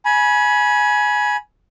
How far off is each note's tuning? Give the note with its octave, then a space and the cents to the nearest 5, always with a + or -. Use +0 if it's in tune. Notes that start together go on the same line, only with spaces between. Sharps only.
G#5 +15 B5 -25